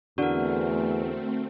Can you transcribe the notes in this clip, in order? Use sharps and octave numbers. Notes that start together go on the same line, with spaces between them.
E2 D3 A3 C4 F#4 A#4